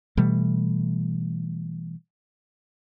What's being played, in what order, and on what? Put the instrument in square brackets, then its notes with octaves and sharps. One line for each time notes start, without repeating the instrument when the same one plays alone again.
[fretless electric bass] B2 E3 G3 A3